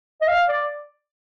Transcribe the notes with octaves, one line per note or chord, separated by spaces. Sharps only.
D#5
F5
D5